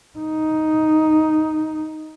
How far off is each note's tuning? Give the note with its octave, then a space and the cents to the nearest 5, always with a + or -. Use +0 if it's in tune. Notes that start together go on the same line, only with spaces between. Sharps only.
D#4 +5